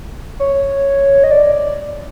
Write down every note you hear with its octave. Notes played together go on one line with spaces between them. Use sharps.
C#5
D#5
D5